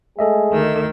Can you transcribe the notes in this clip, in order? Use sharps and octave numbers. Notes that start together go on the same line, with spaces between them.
G#3 A3 G#4 A4 D#5 E5
D2 D#3 E6